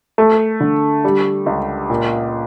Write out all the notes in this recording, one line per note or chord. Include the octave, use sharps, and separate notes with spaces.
A3
D3
G3
C#2
A#2